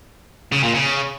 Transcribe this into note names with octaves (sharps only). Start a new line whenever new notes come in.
C#3
A#2
C#3